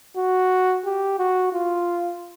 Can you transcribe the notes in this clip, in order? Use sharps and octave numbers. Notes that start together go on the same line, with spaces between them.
F#4
G4
F#4
F4